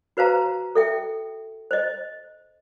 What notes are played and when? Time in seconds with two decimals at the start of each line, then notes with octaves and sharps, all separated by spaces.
0.17 F#4 B4 C5 F5 A5 A#5
0.75 A4 E5 G5
1.71 C5 D#5